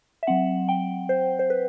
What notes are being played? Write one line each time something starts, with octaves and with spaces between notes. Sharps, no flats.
E5
F#3 C4 F#5
G5
C5
C5
B4